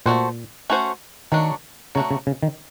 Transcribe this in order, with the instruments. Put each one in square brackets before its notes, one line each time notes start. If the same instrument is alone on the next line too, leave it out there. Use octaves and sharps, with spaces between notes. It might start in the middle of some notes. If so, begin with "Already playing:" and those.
[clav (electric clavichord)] A#2 [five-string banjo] A3 C#4 F#4 A4 C5
[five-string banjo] A3 C#4 F#4 A4 C5
[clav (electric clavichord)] D#3 [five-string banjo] F#3 A3 D4
[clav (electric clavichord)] C#3 [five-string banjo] F#3 A3 D4
[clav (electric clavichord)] C#3
C#3
D#3